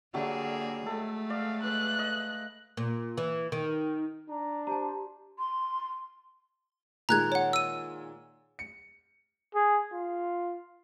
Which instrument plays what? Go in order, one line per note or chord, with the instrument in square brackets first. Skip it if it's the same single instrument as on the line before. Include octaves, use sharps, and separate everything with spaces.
[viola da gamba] D3 A#3 G#4 [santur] F#3 G3 A3
[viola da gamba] G#3 A3 [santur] A4
[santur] D5 [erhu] F5
[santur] B4 E5 F5 [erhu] F#6
[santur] D#5
[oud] A#2
E3
D#3
[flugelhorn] D4 [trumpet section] A#5
[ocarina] G4 [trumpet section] C5 [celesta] A5 A#5
[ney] C6
[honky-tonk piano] A#2 D#3 G#3 [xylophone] A#5 F#6 G#6
[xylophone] C#5 F#5
E6 D#7
[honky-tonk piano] C#7
[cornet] G#4
F4